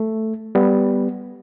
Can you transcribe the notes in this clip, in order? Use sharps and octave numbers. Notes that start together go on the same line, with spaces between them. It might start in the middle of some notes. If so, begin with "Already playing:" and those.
Already playing: A3
G3 B3